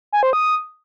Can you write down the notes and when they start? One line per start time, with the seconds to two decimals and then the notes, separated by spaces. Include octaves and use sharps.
0.13 G#5
0.23 C5
0.33 D#6